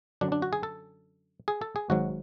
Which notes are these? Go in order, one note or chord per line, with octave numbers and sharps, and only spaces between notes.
F#2 D3 F#3 D4
D4
F#4
G#4
A4
G#4
A4
G#4
G#1 G#2 F#3 F#4